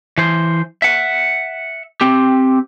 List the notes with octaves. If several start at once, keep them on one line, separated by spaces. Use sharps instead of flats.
E3 C5
E5 F#5
C4 G4